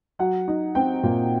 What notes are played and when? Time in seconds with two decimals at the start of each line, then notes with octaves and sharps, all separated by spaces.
0.19 F#3 F#5
0.48 D#4
0.75 C4 G5
1.04 A#2